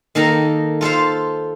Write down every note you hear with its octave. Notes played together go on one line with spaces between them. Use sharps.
D#3 A#3 A4 A#5
F4 A4 C5 F5